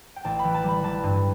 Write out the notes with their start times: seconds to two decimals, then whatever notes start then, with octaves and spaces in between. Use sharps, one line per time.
0.16 G5
0.24 A1 A5
0.39 E3 B5
0.54 A5
0.64 G3 B5
0.83 E3 A5
1.03 G2